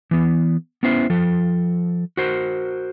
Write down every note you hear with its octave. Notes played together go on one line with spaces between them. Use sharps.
E3 B3
B3 C#4 E4 C5 E5
F3 A4
F#4 A#4 C5